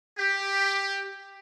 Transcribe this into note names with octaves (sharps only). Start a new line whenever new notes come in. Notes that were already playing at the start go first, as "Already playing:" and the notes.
G4